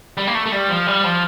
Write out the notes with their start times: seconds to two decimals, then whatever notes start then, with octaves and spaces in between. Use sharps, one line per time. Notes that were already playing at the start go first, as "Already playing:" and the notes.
0.17 G3
0.27 A#3
0.35 A3
0.46 A3
0.52 G3
0.69 F3
0.87 G3
1.04 F3